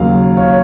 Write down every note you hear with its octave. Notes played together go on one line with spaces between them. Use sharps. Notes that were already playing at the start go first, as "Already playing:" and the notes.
Already playing: D#2 C#3 F#3 F5
C#5 F5
C#5